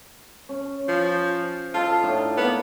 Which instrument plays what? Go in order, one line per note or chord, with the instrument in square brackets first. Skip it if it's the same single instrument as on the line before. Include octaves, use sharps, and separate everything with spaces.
[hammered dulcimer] C#4
[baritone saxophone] F3
[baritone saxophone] F4 [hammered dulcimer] A4 D#5
[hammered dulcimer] A2 D4 D#4
[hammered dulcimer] A#3 [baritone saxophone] B3